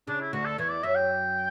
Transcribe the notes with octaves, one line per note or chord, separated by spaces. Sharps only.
C#3 D4
E4
D2 D3 F#4
A4
E2 E3 C#5
D5
F#2 F#3 E5
G5